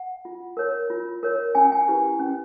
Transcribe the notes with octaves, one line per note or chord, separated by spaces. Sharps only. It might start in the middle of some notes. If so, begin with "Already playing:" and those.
Already playing: F#5
F4
A#4 C#5
F4
A#4 C#5
C#4 G#5
G5
G#5
E4 G4 B4
C#4